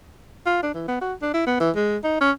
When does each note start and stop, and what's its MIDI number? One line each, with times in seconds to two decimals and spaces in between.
0.46 0.61 65
0.63 0.70 62
0.74 0.86 52
0.88 1.00 59
1.01 1.14 66
1.22 1.29 62
1.34 1.46 64
1.47 1.58 59
1.60 1.71 52
1.76 1.97 56
2.04 2.19 63
2.21 2.31 61